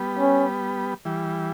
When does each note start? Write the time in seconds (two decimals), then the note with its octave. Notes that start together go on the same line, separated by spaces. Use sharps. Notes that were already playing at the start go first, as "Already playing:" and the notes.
Already playing: G3 B3
0.19 C#4
1.05 E3 G3